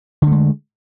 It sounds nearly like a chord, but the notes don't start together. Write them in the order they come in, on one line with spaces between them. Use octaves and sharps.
D3 A3 G#3